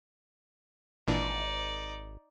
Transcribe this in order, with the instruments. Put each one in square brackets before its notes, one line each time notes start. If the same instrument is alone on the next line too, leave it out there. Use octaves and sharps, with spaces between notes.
[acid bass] G#1 [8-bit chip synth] A#2 E3 D4 [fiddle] D#4 D5